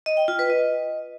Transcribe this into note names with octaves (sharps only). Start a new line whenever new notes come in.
D#5
G5
F4
B4
D#5